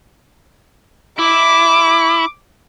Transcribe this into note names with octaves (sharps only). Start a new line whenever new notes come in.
E4 D6